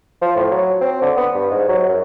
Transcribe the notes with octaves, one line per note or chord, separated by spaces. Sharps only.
F3
A2
F#3
C4
D3
B3
G2
G#2
F#3
F#2